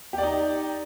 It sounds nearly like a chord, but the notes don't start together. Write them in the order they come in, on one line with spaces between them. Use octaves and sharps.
G4 D5 D#4